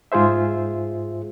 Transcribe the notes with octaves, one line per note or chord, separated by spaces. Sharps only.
G#2 F4 G#4 C5 E5